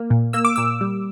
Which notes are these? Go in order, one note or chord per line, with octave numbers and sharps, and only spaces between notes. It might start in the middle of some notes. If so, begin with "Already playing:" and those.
Already playing: A#3
A#2
A#3 E6
D6
A#2 E6
G3